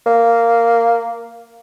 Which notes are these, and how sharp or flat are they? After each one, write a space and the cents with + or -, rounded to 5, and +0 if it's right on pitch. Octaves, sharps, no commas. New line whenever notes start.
A#3 -5